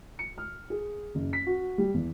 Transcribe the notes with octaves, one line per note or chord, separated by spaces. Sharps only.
C#7
F6
G#4
F#1
B6
F#4
G3
E2